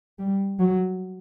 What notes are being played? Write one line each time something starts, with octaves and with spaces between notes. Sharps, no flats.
G3
F#3